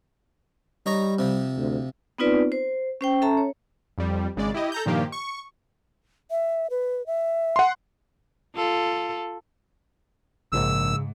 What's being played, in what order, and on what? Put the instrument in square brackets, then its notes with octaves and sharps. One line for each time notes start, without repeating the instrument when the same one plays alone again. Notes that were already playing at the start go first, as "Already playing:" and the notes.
[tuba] G3 [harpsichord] D#4 C#5 A#5
[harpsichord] C3 F3
[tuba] D2
[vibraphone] B3 C4 D#4 F4 B4 D5
C5
C#4 C5 G5
C#4 A4 E5 A5 A#5
C#5
[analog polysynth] F2 G3
G#1 C#3 G#3 D5
E4 G4 D#5
A4 A#5 G6
G2 A#2 D#3 F3 A#3 G4
C#6
[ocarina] E5
B4
E5
[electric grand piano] F#5 C6
[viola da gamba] F4 A4
[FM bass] A#1 [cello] G#2 [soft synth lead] C#3 [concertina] E6